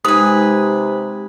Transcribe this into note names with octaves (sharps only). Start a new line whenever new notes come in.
C3 G#3 D#4 B4 G#5 D#6